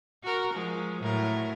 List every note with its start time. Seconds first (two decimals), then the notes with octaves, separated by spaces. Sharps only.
0.23 F#4 A#4
0.54 F3 G#3
1.01 A2 F#3 A#4